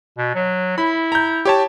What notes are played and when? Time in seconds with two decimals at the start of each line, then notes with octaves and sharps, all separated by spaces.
0.18 B2
0.35 F#3
0.78 E4 B5
1.12 A#5 G6
1.45 G4 C#5 A5